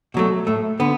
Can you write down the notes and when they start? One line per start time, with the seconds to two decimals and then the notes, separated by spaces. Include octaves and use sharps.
0.14 B2 F#3 A3
0.47 A2 A3
0.80 D3 B3